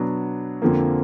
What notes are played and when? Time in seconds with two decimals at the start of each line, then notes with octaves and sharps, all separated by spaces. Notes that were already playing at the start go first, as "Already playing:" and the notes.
Already playing: B2 F#3 B3 D4
0.62 F2 D3 F3 A#3